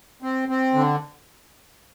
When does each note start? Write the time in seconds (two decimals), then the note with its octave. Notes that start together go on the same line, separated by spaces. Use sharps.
0.22 C4
0.49 C4
0.74 D3